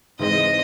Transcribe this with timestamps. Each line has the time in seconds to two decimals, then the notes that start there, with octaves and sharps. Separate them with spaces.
0.19 G#2 E3 G#3 C4 D#5